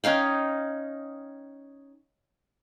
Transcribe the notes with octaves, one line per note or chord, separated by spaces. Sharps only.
C#4 D#4 F5 G5